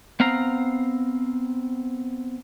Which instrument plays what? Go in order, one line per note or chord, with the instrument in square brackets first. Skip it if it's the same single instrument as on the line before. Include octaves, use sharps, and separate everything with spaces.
[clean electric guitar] B3 C4 F5 A#5